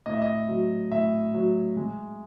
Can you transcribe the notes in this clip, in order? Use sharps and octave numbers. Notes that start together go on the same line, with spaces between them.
A2 D#5
E5
D#5
F#3
A2 E5
F#3
G#3